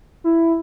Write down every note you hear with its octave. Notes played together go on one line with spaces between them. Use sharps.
E4